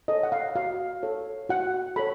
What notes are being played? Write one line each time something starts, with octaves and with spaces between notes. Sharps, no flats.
A4 C#5 D#5
F#5
F5
F#4 F5
A4 C#5
F#4 F#5
A4 C#5 B5